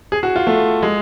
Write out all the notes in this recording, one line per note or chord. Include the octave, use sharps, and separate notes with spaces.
G#4
F#4
F4
A3
G#3